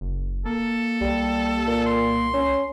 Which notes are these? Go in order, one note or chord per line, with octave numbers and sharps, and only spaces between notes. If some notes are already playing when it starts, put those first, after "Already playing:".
F#1
A#3 A4
C2 G3
A#2
C6
C#4